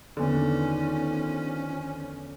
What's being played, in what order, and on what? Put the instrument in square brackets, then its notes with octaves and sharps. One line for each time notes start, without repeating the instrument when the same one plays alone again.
[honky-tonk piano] E2 D3 [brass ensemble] D#3 F3 [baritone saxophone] C#4